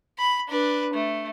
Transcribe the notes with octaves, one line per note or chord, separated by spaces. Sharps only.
B5
D4 B4
A3